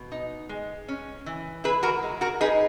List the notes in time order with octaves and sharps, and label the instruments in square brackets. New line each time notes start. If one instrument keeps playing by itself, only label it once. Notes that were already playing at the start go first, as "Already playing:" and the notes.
Already playing: [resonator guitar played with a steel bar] B2
D#4
G#3
C#4
E3
E4 G#4 B4
F#4 A#4
G#3
F#4 A#4
D#4 G#4 B4